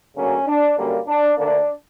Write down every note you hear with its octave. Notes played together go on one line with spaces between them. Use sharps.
D2 C#3 F#3 A#3 C#4
D4
F#2 D3 G3 A#3
D4
D2 D3 A#3 D4